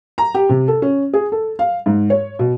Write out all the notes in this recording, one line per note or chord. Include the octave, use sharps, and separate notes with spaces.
A#5
G4
C3
A4
C#4
G#4
A4
F5
G#2
C#5
B2